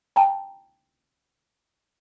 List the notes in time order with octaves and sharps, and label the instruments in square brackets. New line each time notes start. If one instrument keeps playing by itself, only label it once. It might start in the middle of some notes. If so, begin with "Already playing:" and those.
[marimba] G5 A5 A#5